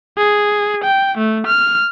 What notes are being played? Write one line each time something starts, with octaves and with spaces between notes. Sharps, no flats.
G#4
G5
A3
F6